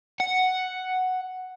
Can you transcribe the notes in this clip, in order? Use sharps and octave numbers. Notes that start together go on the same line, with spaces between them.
F#5